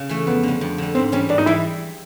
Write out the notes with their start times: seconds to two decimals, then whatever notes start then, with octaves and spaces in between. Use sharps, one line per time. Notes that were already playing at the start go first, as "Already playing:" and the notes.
Already playing: C#3
0.09 E3 A3
0.27 F2 B3
0.43 D3 G3
0.61 F2
0.78 D3 G3
0.95 G#2 C4
1.12 E3 G3 C#4
1.29 G#2 D4
1.38 D#4
1.46 E3 G3 E4